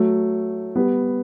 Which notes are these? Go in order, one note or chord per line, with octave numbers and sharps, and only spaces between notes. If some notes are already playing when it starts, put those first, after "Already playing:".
Already playing: F#3 A3
G3 B3